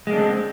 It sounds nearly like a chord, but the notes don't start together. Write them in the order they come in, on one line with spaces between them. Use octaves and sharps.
G#3 A#3 D4 D3 C4